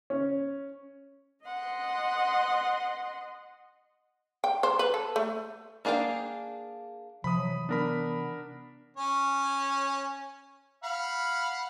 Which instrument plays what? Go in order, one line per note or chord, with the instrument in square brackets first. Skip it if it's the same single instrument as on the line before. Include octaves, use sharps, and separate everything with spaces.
[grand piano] C#4
[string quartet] D#5 F#5 C6
[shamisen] G5
C5
B4
A4
A3
[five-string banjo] A#3 D4 G#4 F5 G5
[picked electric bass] C3 E3 [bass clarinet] F3 [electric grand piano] B5 D#6
[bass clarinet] F#3
[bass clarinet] B3 [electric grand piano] D4 A#4 B5
[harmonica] C#4 C#5
F5 F#5 B5